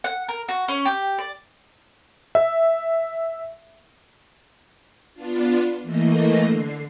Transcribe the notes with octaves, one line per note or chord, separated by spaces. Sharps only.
F#5
A#4
F#4
C#4
G4
D5
E5
B3 D4 F4
E3 A3 A#3 D#5
D3 C7